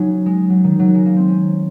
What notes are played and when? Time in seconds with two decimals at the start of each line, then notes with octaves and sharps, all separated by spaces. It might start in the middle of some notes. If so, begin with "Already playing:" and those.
Already playing: F#3 A#3 C#4 D#4
0.26 G#3
0.50 F#3
0.64 D#3
0.79 F#3
0.94 G#3
1.06 A#3
1.17 C4
1.29 C#4